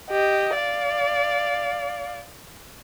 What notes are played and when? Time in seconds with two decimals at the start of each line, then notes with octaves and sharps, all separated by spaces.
0.10 G4 D#5
0.55 D5 F5